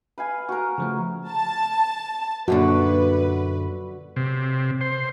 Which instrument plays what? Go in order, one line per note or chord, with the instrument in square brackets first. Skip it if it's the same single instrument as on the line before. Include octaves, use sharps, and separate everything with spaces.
[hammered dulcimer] B4 F5 G#5
F#4 A#4
[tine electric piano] C#3 F3 A3
[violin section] A5
[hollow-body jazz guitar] F#2 A#2 D3 [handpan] F#4 [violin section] B4
[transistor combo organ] C3
C5